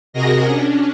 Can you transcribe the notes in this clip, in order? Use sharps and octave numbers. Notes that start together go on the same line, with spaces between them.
C3 F#4 G#4 A#4 D#5 A#6
C#4 D4